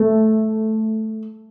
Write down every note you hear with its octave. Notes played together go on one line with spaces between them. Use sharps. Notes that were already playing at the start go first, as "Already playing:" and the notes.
Already playing: A3